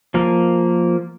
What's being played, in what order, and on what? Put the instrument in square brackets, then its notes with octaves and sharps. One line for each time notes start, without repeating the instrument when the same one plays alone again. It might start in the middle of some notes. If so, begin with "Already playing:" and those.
[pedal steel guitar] F3 A#3 A#4